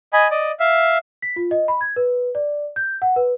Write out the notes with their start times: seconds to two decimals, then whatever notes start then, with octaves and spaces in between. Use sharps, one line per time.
0.13 D#5 G#5 B5
0.31 D5 D#5
0.60 E5 F5
1.22 B6
1.36 F4
1.51 D#5
1.68 B5
1.81 G#6
1.96 B4
2.35 D5
2.76 G6
3.02 F#5
3.16 B4